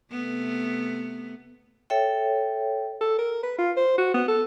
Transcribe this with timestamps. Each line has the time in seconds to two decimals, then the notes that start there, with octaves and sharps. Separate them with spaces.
0.11 C3 A3 B3
1.90 A4 C#5 E5 G5
3.01 A4
3.19 A#4
3.43 B4
3.58 F4
3.77 C5
3.98 F#4
4.14 B3
4.28 A4